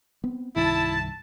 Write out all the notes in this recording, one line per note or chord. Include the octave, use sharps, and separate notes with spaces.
B3 C4
C2 G2 D#3 E4 A5